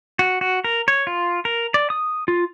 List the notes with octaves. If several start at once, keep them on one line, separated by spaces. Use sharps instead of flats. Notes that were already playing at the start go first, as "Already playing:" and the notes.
F#4
F#4
A#4
C#5
F4
A#4
D5
D#6
F4